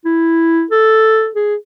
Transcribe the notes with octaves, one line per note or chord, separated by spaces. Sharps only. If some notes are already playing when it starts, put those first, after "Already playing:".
E4
A4
G#4